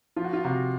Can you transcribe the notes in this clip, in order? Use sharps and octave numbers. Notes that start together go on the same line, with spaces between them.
F3 F4
F#4
F4
C3 F#4